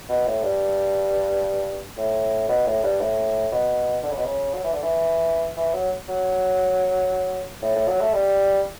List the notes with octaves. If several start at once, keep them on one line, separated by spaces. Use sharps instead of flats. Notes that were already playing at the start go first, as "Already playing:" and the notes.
B2
A2
G2
A2
B2
A2
G2
A2
B2
D3
C#3
B2
C#3
F#3
E3
D3
E3
E3
F#3
F#3
A2
A2
F#3
A3
G3